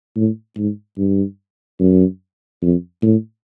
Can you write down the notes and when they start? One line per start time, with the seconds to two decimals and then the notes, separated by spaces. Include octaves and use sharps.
0.16 A2
0.57 G#2
0.98 G2
1.80 F#2
2.62 F2
3.03 A2